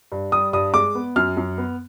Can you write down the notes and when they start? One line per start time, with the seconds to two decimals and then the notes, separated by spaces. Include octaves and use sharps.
0.12 G2
0.32 G3 D#6
0.53 G2 D#6
0.74 G#3 D6
0.95 B3
1.16 F#2 F6
1.37 F#2
1.58 B3